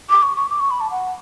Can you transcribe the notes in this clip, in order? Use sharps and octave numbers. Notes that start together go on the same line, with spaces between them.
D6
C#6
C#6
D6
C#6
B5
A5
F#5